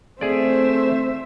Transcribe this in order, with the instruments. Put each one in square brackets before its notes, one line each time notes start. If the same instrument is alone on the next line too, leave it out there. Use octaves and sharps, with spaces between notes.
[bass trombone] A3 [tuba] C4 [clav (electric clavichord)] G#4 D5 [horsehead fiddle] C5 E5